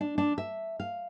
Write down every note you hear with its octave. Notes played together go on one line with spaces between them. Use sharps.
D4
D4
E5
F5